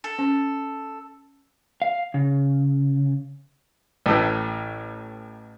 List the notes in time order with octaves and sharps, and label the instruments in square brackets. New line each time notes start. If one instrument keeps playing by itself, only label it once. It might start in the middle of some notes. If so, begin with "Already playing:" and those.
[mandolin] A4
[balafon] C#4
[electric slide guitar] F5
C#3
[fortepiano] A1 A2 E3